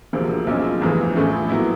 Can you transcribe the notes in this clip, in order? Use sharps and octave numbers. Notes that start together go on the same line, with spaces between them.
E1 D2 C3 F3 A#3
B1 A#2 F3 G#3 C#4
G1 F2 C3 E3 A3
A1 A2 F3 A3 C#4
A#2 F#3 B3 E4